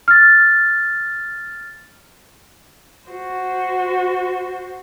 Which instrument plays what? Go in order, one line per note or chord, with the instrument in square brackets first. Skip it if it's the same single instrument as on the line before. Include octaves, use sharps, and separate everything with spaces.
[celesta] F6 A6
[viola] F#4 C5